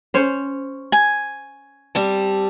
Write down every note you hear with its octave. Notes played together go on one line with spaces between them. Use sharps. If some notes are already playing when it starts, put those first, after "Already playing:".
C#4 C5 C#5
G#5
G3 C4 A5